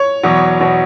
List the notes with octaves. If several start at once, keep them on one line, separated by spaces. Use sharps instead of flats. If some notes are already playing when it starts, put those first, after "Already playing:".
Already playing: C#5
E2 B2 F#3
B2 F#3